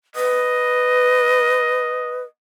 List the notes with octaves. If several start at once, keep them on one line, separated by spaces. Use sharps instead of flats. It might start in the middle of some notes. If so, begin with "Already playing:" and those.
B4 D#5